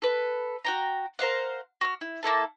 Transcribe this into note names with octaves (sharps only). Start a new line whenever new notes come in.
A4 B4
F#4 G5 A#5
A#4 C5 F5 F#5
F#4 C#6 F6
E4
A#3 E4 A4 A5